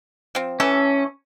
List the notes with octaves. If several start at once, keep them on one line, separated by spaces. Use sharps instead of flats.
F3 C4
E3 A3 C#4 A4